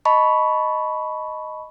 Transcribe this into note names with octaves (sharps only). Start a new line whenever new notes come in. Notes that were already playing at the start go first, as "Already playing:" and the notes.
D#5 A5 B5 C#6